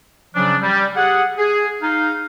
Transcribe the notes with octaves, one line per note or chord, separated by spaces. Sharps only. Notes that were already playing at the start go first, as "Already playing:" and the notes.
C#3 F3 F#3 C#4 D4
G3
G4 G#4 F#5
G#4
D#4 F5